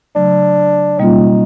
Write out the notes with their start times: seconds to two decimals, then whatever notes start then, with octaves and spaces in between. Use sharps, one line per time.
0.15 C#3 F#3 A3 D4
0.99 B2 G3 A#3 C#4 D#4 F4